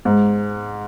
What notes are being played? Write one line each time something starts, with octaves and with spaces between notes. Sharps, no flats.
G#2